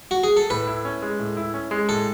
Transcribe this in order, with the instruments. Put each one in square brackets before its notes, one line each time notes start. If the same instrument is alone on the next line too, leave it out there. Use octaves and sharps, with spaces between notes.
[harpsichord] F#4
G#4
A4
[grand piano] A2 [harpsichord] B4
[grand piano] E4
C#4
G#3
A2
E4
C#4
G#3
[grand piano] A2 [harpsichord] A4